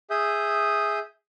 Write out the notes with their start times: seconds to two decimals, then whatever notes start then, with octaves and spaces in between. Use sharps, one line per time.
0.10 G#4 E5 D#6 G6